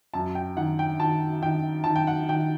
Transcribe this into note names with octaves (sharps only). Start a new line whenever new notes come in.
F#2 A5
G5
D#3 F#5
G5
D#3 A5
D#3 G5
D#3 A5
G5
F#5
D#3 G5